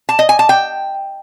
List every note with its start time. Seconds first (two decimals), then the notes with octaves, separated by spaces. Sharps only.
0.09 A5
0.19 D#5
0.29 G#5
0.39 A5
0.49 G5